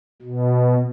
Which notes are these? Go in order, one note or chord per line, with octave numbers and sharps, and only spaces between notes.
B2